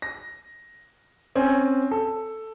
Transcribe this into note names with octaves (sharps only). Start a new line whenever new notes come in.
A#6
C4 C#4 G#5
A4